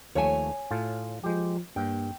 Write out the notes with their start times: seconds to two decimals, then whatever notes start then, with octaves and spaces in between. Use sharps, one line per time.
0.15 D#2 F3 A3 C#5 G#5
0.71 A2 F4 A5
1.24 F3 G#3 G4
1.76 G2 A#3 G5